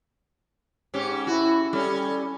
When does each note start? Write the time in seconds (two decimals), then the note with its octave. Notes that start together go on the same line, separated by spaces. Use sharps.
0.94 G#2 C#4 G4
1.27 E4 F#4
1.73 G3 C#4 A4